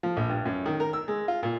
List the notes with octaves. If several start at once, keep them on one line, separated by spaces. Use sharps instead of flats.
F3
A#1
G2
F#2
D#3
A#4
E6
G#3
F4
A#2